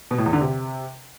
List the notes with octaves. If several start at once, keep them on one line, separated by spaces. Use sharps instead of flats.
B2
A2
E2
D3
C3